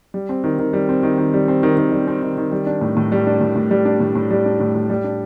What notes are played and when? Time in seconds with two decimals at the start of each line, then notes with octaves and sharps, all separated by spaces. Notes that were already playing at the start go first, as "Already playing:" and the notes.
0.14 G3
0.29 C4
0.44 D#3
0.59 D#3
0.73 G3
0.89 C4
1.03 D#3
1.18 D#3
1.34 G3
1.48 C4
1.63 D#3
1.77 D#3
1.92 G3
2.07 C4
2.22 D#3
2.38 D#3
2.52 G3
2.66 D4
2.81 A2
2.97 A2
3.12 G3
3.27 D4
3.41 A2
3.56 A2
3.71 G3
3.85 D4
4.00 A2
4.15 A2
4.30 G3
4.45 D4
4.60 A2
4.75 A2
4.90 G3
5.04 D4